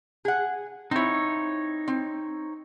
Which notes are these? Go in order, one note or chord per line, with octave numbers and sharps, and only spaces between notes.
G#4 F#5
C4 D#4 E4 C#5
C4